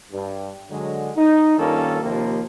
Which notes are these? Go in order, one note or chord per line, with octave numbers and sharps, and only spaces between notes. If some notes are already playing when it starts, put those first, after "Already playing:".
G2
D3 F#3 G#3
D#4
G2 D#3 A#3 C#4 F4 A4
D#2 C3 F3 A#3